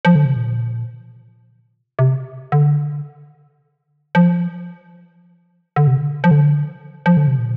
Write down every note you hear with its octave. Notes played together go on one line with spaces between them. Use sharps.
F3
D3
C3
A#2
C3
D3
F3
D3
C3
D3
F3
D3
F3
D3
C3
A#2